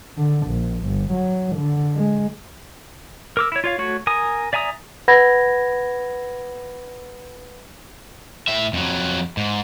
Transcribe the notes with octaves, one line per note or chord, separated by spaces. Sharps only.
D3
A#1
G1
F#3
D3
G#3
A#4 D6 E6
E4 C#5
F4 C#5 F5
A3 F#4 C#5
A#4 G#5 D#6
D5 E5 G#5 A#5 D#6
B4 F#5 B5 G#6 A#6
A2 E5
F2 F#3
G#2